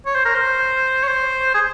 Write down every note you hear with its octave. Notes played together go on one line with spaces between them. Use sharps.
C#5
C5
A#4
C5
C#5
C5
G#4